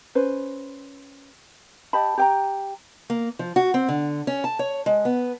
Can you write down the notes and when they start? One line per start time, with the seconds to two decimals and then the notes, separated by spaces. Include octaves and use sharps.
0.15 C#4 B4 C5
1.93 G4 D#5 A5 B5
2.18 G4 G5 A#5
3.10 A#3
3.39 F3
3.56 F#4
3.74 C4
3.89 D3
4.27 C#4
4.44 A5
4.59 C#5
4.86 G#3
5.05 B3